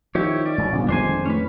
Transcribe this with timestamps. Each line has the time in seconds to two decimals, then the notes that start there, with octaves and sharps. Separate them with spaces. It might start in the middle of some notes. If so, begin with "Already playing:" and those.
0.15 D#3 F3 E4 G4 C#5
0.46 C#4 D5
0.58 G#2 C#3 F#3
0.72 G1 A#2 C#3 F3
0.89 F2 D#3 G#3 D4 C5 G#5
1.26 A2 C#4 B4